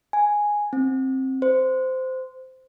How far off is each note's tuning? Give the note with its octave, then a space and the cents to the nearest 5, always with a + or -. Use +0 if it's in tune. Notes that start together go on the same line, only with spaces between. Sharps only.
G#5 +0
C4 +15
C5 -15